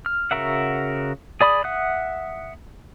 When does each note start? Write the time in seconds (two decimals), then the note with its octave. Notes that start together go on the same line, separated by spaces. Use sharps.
0.06 F6
0.31 C#3 F#4 A#4 E5 F#5
1.41 G#4 D5 B5 D#6
1.64 E5 F#5 D#6 F#6